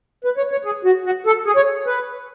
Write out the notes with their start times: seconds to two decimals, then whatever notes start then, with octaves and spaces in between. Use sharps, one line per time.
0.25 B4
0.37 C#5
0.52 C#5
0.65 G#4
0.85 F#4
1.06 F#4
1.26 A4
1.46 G#4
1.56 C#5
1.87 B4